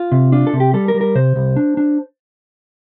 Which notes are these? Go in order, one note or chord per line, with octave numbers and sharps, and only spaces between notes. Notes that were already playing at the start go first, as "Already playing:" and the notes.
Already playing: F4
C3
D4 F4
A4
C3
G4
G3 A4
A#4
G3
A#4
C3 C5
C2
D4
D4